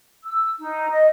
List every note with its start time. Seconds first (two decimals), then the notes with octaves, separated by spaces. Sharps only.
0.25 E6
0.59 D#4
0.90 D#5